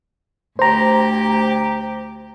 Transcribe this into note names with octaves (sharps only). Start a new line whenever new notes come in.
D2 G4 C5 A#5